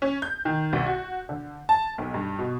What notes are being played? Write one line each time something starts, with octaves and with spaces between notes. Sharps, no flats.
C#4
G6
D#3
C2
F#4
D3
A5
B1
G2
B2